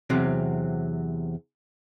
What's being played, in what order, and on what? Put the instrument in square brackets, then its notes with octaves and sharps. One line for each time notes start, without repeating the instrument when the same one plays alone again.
[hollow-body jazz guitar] E2 C3 F#3 C4